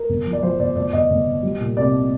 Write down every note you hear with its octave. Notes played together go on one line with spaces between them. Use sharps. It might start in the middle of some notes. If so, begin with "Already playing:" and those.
Already playing: A#4
G1
F3
D5
F3 C5
G1 D5
G1 D5
G1 D#5
G1
G1
G3
A#2
C2 D5